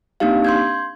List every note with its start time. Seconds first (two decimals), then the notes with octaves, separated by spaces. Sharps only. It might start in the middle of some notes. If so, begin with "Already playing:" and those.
0.20 A#3 C4 D4 D#4 G4 F5
0.45 C6 G6 G#6